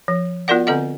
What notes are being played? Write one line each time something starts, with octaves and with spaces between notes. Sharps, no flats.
F3
B3 F4 F#4 A#4 D5 F#5
D3 C4 A4 D#5 F#5